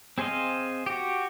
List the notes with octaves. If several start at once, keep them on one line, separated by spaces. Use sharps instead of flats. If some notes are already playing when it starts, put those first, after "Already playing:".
C4 G#4 C5 D#5 F5
F#4 G4